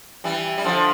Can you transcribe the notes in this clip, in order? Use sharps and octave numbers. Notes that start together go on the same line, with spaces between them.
E3 G3
G3
D3 F3